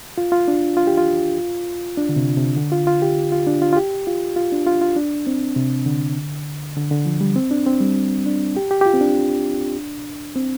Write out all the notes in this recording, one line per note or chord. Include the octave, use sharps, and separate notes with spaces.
F4
F4
D4
F4
G4
F4
D4
D3
C3
C3
D3
F4
F4
G4
F4
D4
F4
F4
G4
F4
F4
D4
F4
F4
D4
C4
C3
D3
D3
D3
F3
G3
C4
D4
C4
G3
D4
G4
G4
G4
F4
C4
D4
C4